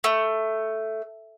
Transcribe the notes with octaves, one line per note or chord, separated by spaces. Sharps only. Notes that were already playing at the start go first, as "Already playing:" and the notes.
A3